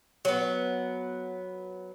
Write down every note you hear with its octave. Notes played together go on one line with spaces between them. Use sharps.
F#3 B3